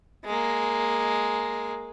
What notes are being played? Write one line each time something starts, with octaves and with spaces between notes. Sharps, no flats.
G#3 A#3